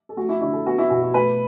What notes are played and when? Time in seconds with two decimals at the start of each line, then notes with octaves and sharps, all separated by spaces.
0.09 A4
0.17 A3 F#4
0.29 E4
0.41 D3 E4
0.53 A4
0.66 B3 F#4
0.78 E4
0.90 B2 F#4
1.02 F#4
1.14 A3 B4